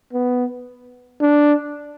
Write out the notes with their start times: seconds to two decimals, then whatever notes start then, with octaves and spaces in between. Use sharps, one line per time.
0.13 B3
1.21 D4